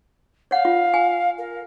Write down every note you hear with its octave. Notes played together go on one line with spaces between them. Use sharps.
C#5 F5 F#5
F4
G#5
A#4